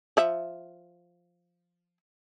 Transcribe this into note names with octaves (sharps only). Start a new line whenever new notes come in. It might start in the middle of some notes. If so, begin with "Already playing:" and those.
F3 E5